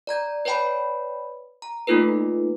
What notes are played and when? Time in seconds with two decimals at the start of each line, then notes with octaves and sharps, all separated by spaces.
0.07 D5 A#5 G#6
0.45 B4 C#5 D5 G5 A5 B5
1.62 A#5
1.87 A3 A#3 D#4 F4 A4 B4